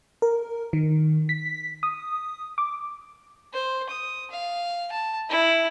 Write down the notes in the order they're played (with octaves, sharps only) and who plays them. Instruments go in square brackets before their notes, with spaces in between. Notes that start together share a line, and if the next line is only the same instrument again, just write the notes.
[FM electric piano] A#4
D#3
B6
D#6
D6
[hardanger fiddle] C5
D#6
F5
A5
E4